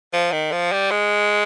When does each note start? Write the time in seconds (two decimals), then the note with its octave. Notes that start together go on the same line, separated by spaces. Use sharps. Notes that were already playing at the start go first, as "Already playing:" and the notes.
0.13 F3
0.32 D#3
0.52 F3
0.72 G3
0.91 G#3